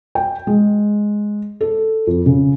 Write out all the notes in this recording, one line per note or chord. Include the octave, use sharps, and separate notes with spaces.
G5
G#3
A4
F2
C#3